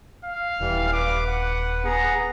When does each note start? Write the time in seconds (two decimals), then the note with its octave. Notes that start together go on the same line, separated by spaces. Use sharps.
0.25 F5
0.60 D#1 E3 G3
0.93 B4 D6
1.27 F#5
1.84 B3 G#4 F#5 A#5